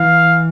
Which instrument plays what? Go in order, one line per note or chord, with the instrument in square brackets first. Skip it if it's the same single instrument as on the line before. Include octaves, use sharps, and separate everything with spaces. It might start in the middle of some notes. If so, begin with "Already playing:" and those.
Already playing: [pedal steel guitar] E3 [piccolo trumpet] F5